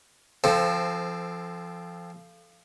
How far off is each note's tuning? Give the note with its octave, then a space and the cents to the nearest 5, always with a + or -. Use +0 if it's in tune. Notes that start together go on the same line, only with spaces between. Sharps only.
F3 -20 C4 +0 A4 +0